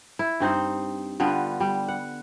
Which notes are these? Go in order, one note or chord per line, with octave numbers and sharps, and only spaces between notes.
E4
G2 C4 D#4 C5
D3 G3 B3 F4
G3
F#5